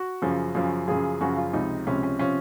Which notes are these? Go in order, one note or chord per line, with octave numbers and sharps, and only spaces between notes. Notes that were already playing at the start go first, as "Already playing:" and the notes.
Already playing: F#4
F#2 C#3 F3
F#2 C#3 F3
F#2 C#3 F3 G#4
F#2 C#3 F3 F#4
F4
C#2 C3 F3 D#4
C#2 C3 F3 C#4
C#4
C3 F3 C#4